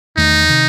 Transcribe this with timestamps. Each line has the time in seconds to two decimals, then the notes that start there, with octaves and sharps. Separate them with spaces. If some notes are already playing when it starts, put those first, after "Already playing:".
0.17 E2 D#3 A3 D#4
0.49 C3 D#3